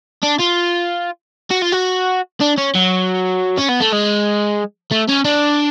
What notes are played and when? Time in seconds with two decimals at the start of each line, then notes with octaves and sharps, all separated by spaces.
0.23 D4
0.39 F4
1.51 F#4
1.62 F4
1.73 F#4
2.41 D4
2.57 C#4
2.75 F#3
3.58 C#4
3.68 B3
3.80 A3
3.92 G#3
4.92 A3
5.09 C#4
5.25 D4